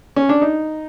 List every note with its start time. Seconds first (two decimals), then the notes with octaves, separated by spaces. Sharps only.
0.16 C#4
0.29 D4
0.41 D#4